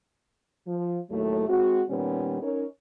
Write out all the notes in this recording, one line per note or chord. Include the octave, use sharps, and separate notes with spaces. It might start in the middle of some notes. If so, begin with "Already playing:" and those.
F3
D#2 A2 F#3 A3
G#3 C4 F#4
A#2 D#3 G3 B3 C#4
C#4 D#4 A#4 C#5